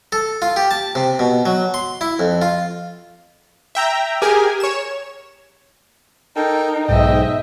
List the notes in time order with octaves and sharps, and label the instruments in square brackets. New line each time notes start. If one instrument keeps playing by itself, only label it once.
[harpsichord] A4
F4
G4
A5
C3
B2
F#3
C6
E4
F2
F4
[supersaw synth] E5 G5 A#5
G4 G#4 A#4 G#5
C#5 E7
[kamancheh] D#4 [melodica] A4 A#4 G5
[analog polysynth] B1 G#2 [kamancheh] D#5 E5 [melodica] G5